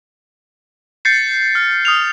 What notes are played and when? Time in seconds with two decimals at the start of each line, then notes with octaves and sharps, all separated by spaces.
1.05 G6 A6 C7 C#7
1.55 F6
1.85 D#6 F6 F7